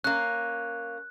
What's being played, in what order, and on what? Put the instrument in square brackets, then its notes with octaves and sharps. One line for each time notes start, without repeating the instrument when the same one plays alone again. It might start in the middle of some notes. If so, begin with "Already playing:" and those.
[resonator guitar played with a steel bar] A#3 C#4 [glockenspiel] F#6